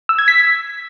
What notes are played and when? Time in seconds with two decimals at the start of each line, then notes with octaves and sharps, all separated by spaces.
0.09 E6
0.19 G#6
0.28 B6